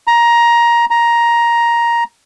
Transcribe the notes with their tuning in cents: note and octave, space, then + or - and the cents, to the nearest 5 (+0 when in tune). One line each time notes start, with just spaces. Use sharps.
A#5 +15
A#5 +10